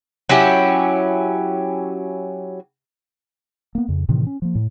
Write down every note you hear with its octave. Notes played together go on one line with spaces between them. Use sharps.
F#3 C#4 E4 G4
A#3 B3
F2 C#3
A2 C3 D#3 E3
C#4
F3 A#3
A2